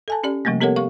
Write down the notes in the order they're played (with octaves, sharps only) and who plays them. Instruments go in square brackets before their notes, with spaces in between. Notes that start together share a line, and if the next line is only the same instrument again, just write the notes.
[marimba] A4 G#5 A5
C#4 G4 D5
C3 F3 G3 A3 A#3
B3 G4 A4 A#4 C#5 F#5
G4 F5 C#6